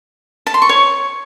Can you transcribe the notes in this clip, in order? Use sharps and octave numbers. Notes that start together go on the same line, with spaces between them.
A5
C6
C#6
C#5